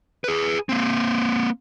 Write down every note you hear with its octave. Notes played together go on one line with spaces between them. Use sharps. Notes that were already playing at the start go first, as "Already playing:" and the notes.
G#4 B4
A#3 C4